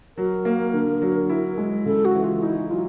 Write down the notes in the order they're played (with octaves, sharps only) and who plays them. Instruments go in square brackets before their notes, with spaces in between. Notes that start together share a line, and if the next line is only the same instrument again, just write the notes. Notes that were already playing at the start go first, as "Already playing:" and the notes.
[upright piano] F#3 [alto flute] A#4
[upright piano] A#3
D3
F#3
E4
G#3
[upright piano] C#3 [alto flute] A4
[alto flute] F#4
[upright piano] E3
[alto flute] F4
[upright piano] D#4 [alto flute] E4
[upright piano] F#3 [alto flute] F4